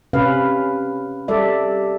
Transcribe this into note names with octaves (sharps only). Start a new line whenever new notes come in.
C3 C#4 B4 F5
G3 A4 D5 E5